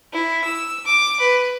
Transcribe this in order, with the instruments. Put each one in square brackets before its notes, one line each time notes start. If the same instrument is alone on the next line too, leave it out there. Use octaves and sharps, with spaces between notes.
[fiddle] E4
E6
D6
B4